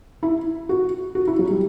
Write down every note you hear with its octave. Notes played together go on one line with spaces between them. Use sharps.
E4
F#4
F#4
E4
F#3
G3